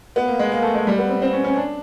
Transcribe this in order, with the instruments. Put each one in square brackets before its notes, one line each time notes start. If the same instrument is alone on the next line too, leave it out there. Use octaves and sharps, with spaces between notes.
[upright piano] B3
A#3
G#3
A#3
A3
G#3
G3
B3
C4
C4
C#4
C#4
D4